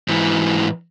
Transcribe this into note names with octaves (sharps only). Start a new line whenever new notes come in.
G#2 E3